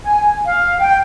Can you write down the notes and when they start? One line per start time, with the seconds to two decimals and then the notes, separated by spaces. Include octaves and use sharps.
0.04 G#5
0.45 F5
0.80 G5